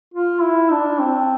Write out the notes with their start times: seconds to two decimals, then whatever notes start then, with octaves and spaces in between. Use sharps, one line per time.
0.14 F4
0.43 E4
0.71 D4
1.01 C4